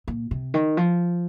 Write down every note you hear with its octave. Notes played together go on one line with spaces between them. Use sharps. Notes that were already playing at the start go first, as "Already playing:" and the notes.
A#2
C3
D#3
F3